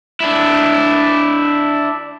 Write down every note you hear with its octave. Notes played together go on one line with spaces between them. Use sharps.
D4 E4